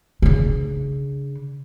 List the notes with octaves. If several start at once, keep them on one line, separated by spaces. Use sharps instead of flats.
C#3 D4